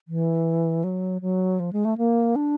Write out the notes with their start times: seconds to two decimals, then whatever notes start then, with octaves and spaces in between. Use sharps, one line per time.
0.08 E3
0.84 F#3
1.22 F#3
1.60 F3
1.73 G#3
1.85 A3
1.98 A#3
2.36 D4